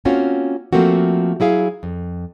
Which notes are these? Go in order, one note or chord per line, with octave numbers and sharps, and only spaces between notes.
A#3 C4 C#4 F4 F#4
F3 A3 A#3 C4 F#4
F#3 E4 G#4 F5
F2